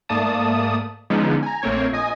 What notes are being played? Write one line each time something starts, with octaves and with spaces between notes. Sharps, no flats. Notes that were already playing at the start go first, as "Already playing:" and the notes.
G#2 A3 A#3 D5 A5 D#6
D3 F3 G#3 B3 C#4 D#4
G#5 A#5
A#1 A3 A#3 C4 C#5 G#6
A#1 D#5 G#5 D#6